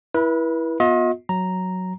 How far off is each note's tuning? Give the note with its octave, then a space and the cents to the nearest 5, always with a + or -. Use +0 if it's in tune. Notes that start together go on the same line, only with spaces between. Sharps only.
E4 +0 B4 -35
B3 -10 F4 +40 D#5 +35
F#3 +0 A#5 +0